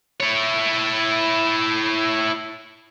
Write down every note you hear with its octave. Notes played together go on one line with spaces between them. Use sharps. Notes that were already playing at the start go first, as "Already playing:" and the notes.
E4 C#5